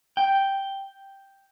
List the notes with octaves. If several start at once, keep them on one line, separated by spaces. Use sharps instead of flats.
G5